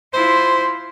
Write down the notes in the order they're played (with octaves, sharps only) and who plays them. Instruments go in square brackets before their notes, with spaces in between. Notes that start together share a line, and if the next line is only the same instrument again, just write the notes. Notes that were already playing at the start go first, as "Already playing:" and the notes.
[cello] E4 F4 [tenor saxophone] C5